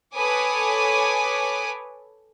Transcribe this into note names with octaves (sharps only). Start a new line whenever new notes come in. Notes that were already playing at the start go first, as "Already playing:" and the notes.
A4 B4 C#5 G#5 D6 D#6